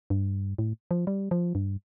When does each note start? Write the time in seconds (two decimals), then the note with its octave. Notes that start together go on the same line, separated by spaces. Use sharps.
0.10 G2
0.58 A2
0.91 F3
1.07 G3
1.31 F3
1.55 G2